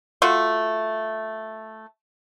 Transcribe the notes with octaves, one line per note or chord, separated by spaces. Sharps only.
A3 F4 F#4